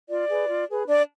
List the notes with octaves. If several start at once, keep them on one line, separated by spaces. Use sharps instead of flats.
F4 D5
G#4 B4
F4
G#4 B4
D4 D5